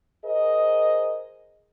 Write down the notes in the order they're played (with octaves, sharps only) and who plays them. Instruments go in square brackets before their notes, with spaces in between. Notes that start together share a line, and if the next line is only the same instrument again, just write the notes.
[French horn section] G#4 A#4 C5 D#5